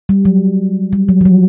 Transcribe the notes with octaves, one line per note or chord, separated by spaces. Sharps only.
G3
F#3
G3
F#3
F3
F#3